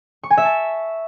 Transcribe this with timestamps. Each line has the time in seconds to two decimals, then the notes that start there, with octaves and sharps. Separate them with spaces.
0.23 C#6
0.30 G#5
0.37 E5
0.44 A5